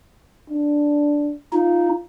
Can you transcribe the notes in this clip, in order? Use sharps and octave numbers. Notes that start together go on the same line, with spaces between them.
D4
D#4 F4